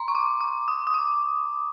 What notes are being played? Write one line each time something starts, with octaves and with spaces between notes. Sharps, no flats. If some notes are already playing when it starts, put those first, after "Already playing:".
Already playing: A#5 C6
C#6
D6
D6
D#6
D#6
D6